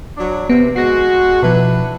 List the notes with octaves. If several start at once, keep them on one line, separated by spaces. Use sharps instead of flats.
F#3 D4
C3 B3
G#3 F#4 A#6 C7
B2 F3 D4 E4 B4